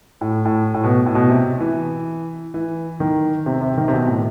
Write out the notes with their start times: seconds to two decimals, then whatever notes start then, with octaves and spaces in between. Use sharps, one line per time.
0.21 A2
0.45 A2
0.74 A2
0.84 B2
1.06 A2
1.15 B2
1.30 C3
1.60 E3
2.54 E3
3.00 D#3
3.46 C3
3.61 C3
3.77 D#3
3.88 C3
3.93 B2
4.07 A2